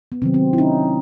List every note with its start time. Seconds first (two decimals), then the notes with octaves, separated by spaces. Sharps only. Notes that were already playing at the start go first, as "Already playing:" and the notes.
0.12 B3
0.22 C3 D#3 F#3 C4
0.34 C4
0.53 E4
0.58 C#4 D#4